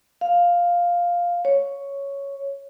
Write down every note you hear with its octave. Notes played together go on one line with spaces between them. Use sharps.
F5
C#5